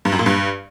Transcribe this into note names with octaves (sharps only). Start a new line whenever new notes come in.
G2
F#2
A#2
G2